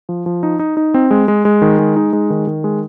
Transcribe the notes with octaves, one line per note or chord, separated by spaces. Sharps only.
F3
F3
D#4
D#4
D#4
C4
G#3
G#3
G#3
D#3
G#3
D#4
G#3
D#3
D#3
G#3